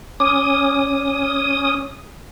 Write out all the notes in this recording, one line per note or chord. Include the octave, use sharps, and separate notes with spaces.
C#4 D6 D#6